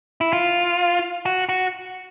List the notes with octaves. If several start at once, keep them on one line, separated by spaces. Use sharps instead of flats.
E4
F4
F#4
F#4